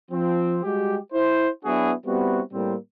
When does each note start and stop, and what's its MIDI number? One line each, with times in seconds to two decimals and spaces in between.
0.11 0.58 53
0.11 0.58 60
0.63 0.96 55
0.63 0.96 56
0.63 0.96 66
0.63 0.96 67
1.13 1.49 64
1.13 1.49 72
1.65 1.92 54
1.65 1.92 59
1.65 1.92 62
1.65 1.92 64
1.65 1.92 66
1.65 1.92 68
2.05 2.40 55
2.05 2.40 59
2.05 2.40 60
2.05 2.40 64
2.05 2.40 66
2.53 2.75 45
2.53 2.75 55
2.53 2.75 58
2.53 2.75 60